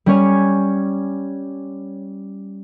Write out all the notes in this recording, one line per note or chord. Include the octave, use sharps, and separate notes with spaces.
G3 C#4 C#5 G#5